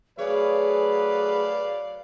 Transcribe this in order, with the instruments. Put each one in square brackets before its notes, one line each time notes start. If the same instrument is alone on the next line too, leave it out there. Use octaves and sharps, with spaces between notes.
[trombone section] F#3 A3 B4 [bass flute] G#4 [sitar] C#5 [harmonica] D5 F5